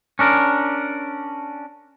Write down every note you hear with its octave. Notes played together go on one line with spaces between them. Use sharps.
C#4 D4 A#4